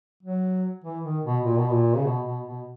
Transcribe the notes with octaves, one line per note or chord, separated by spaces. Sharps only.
F#3
E3
D#3
B2
A#2
B2
A#2
C#3
B2
B2
B2